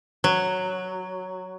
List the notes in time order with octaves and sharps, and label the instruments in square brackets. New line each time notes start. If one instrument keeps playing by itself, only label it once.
[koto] F#3